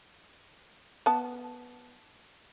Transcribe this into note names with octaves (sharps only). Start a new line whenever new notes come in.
B3 A5